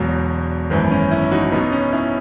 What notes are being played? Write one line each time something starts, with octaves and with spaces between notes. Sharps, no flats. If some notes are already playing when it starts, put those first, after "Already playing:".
Already playing: E1 E2 B2 F#3
G#1 F#2 E3 B3
C#4
C#4 E4
D#4 F#4
B1 B2 F#3 B3 D#4
C#4
C#4 E4